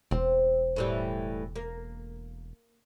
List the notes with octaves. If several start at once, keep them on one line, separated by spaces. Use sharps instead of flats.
E1 C4
A2 E3 G3
A#3